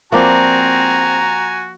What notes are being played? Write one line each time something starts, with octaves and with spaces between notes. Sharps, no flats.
F3 A#3 C4 F#4 D5 G#5 A#5